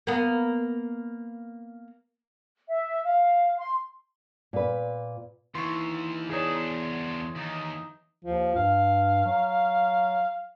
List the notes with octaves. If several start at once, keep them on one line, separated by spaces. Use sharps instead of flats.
A#3 B3
E5
F5
C6
A#2 B4
D#2 E3 C6 C#6
E2 D4 D#4 G#4 C#5
C6
D#2 D#4
D#2 F3
G2 F5
F#3